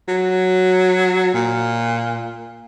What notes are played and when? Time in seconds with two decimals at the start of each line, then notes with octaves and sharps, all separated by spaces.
0.08 F#3
1.34 A#2